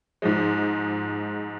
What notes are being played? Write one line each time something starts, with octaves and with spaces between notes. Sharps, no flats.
G#2 F3 G#3